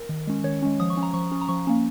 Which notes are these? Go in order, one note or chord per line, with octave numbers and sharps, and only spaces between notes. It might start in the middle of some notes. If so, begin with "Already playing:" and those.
Already playing: A#4
D#3
G#3 C#4
D#3 C#5
G#3 C#4
F3 D#6
C#6
C#4
A#5
F3 C#6
C#4
A#5
F3 C#6
A#3 C#4